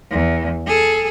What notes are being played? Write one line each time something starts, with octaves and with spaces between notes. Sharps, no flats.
E2
G#4 A4